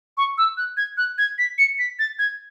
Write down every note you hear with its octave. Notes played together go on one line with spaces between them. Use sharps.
C#6
E6
F#6
G#6
F#6
G#6
B6
C#7
B6
A6
G#6